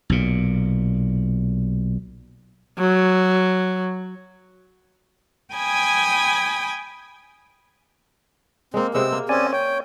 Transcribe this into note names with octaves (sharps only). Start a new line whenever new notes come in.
B1 A#2
F#3
G5 G#5 B5 D#6 G#6
G#3 A#3 C4
C3 G#3 B3 C4 E6
A#3
C4 C#4 D5 G#5
C#5 G5